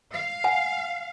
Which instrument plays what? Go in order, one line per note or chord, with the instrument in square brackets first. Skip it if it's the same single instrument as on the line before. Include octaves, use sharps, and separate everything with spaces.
[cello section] F5
[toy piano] F#5 G#5